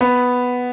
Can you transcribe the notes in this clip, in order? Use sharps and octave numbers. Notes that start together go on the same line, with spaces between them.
B3